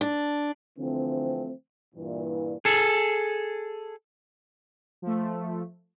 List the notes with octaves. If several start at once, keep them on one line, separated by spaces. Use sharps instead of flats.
D4
D3 E3 F3 A3 C4
G2 A#2 E3
G#4 A4
F3 A3